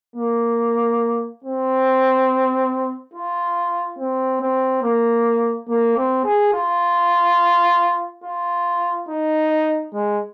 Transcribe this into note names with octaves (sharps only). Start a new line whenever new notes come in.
A#3
C4
F4
C4
C4
A#3
A#3
C4
G#4
F4
F4
D#4
G#3